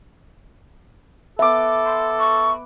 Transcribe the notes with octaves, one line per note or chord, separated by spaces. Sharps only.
B3 A4 E5 D6
C6
C#6